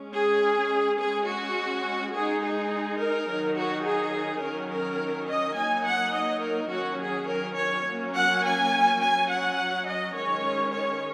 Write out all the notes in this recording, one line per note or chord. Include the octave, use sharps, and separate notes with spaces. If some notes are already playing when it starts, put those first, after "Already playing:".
Already playing: G#3 C#4
G#4
G#3 C#4 G#4
F#4
G#3 D#4 G#4
G#4
A#4
D#3 F#3 D#4
F#4
G#4
D#3 F#3 C#4 A#4
A#4
D#5
F#3 A#3 D#4 G#5
F#5
D#5
A#4
D#3 F#3 C#4 F#4
G#4
A#4
C#5
F#3 A#3 C#4
F#5
G#5
F#3 C#4 G#5
F#5
D#5
D#3 G#3 C#4 C#5
C#5